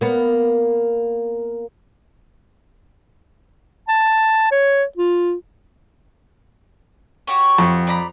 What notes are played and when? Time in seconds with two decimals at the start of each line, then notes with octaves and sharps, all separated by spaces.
0.01 A#3 B3
3.89 A5
4.51 C#5
4.97 F4
7.27 F#4 G4 C#5
7.58 F2
7.87 D5 A#5 B5